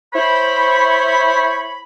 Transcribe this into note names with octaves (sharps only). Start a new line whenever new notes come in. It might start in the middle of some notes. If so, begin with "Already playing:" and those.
E4 C5 C#5 B5